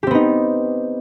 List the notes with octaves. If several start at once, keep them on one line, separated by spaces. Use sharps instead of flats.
B3 C4 D#4 G4